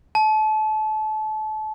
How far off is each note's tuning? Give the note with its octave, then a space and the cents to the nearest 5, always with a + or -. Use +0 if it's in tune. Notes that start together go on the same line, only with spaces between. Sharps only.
A5 -30